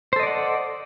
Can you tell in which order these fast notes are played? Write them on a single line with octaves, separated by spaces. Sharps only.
C5 A4 D#5 D5 F#5